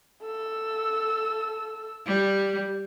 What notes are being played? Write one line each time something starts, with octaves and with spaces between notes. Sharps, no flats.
A4 E6
G3